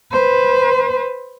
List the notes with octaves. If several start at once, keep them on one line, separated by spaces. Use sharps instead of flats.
B4 C5